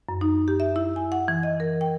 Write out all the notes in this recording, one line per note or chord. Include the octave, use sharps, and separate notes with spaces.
F#2
D#4
G4
E5
E4
G#5
F#5
E3
D#5
A#4
G5